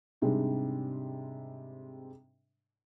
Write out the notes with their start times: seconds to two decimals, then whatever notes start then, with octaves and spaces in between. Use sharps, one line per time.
0.22 G#2 C3 G3 G#3 D4